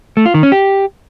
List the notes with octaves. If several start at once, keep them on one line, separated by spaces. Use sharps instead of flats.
A3
F4
D#3
C#4
G4